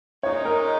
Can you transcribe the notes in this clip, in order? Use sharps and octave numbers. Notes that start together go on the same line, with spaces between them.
A#2 G#3 D#4 C#5
A#4